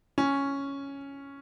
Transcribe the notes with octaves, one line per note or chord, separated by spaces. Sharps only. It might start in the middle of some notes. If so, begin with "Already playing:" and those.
C#4